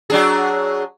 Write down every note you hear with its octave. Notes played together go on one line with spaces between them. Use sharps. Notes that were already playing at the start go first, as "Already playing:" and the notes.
F#3 D4 G#4